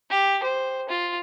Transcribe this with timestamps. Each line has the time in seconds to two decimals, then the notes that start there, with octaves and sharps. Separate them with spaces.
0.10 G4
0.43 C5
0.89 F4